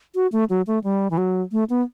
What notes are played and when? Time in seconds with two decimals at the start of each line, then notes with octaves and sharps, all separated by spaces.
0.15 F#4
0.32 A3
0.50 F#3
0.67 A3
0.84 G3
1.11 E3
1.18 F#3
1.52 A3
1.70 B3